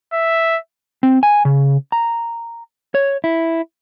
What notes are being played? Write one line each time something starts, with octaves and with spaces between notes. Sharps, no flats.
E5
C4
G#5
C#3
A#5
C#5
E4